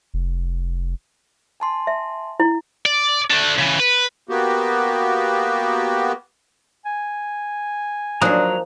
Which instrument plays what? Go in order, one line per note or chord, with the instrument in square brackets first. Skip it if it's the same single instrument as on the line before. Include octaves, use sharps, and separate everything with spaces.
[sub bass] F1
[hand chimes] G#5 A5 C6
[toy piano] E5
E4
[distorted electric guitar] D5
A3 D4
C#3 E3
B4
[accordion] A#3 B3 F#4 G4
[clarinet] G#5
[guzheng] F3 A#3 D#4 [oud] F#3 D4 [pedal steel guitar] A#5 D#6 F#6